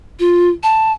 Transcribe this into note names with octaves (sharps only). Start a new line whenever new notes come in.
F4
A5